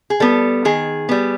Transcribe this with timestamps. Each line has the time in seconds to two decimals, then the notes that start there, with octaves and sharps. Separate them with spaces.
0.10 G#4
0.20 G3 B3 A4
0.65 D#3 G#4
1.09 G3 B3